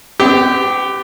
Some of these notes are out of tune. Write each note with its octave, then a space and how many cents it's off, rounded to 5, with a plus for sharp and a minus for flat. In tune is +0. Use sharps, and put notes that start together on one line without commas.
B3 +40 G4 +0